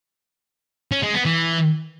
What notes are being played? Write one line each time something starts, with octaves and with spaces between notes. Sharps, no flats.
C#4
G#3
B3
E3